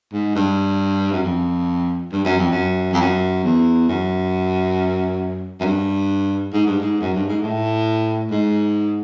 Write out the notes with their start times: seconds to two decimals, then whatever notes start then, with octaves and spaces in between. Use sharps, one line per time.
0.13 G#2
0.35 G2
1.12 F#2
1.23 F2
2.12 G2
2.25 F#2
2.38 F2
2.51 F#2
2.93 F2
3.01 F#2
3.44 E2
3.89 F#2
5.60 F#2
5.65 G2
6.53 G#2
6.67 G2
6.80 G#2
7.01 F#2
7.14 G2
7.28 G#2
7.42 A2
8.31 G#2